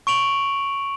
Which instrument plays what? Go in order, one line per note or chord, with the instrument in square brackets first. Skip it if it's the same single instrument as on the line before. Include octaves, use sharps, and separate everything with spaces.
[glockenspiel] C#6 D7 F7 F#7